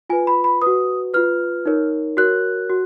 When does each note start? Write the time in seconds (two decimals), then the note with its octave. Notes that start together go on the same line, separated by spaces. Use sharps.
0.10 F4 B4 G#5
0.27 B5
0.44 B5
0.62 F#4 B4 D#6
1.14 F4 B4 F6
1.66 D#4 A#4 C#5
2.17 F#4 A#4 C#5 F#6
2.69 F#4